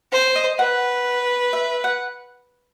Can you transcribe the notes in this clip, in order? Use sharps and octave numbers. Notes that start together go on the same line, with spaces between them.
C5
D#5
B4 F#5
E5
F#5